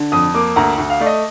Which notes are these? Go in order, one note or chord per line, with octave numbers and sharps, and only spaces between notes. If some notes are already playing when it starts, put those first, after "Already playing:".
Already playing: D3
F2 D#6
A#3 D6
D2 A#5
D2
F5
A3 D5
D#5